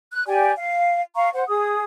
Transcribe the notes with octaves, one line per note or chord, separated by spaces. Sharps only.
F#6
G4 D5 G5 G#5
F5
F5 A#5 C#6
C5 F#5
G#4 D#6